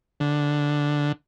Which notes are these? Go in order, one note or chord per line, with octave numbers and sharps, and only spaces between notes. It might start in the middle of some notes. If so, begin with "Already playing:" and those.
D3